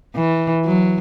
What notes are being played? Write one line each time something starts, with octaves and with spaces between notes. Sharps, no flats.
E3
F#3